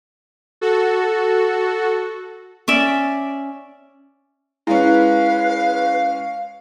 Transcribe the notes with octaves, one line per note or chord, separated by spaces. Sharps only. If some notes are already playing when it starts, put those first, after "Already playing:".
F#4 A4
C#4 D5 E5
G#3 C#4 E4 B4 F5